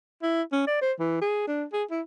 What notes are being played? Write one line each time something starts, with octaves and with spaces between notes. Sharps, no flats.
E4
C#4
D5
C5
E3
G#4
D4
G#4
E4